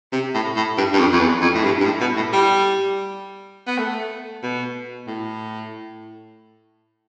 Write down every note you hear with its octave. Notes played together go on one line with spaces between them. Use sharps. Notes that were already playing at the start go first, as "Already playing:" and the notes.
C3
A2
A2
G2
G2
F2
F2
E2
F2
A2
G2
G2
A2
B2
A2
G3
B3
A3
B2
A2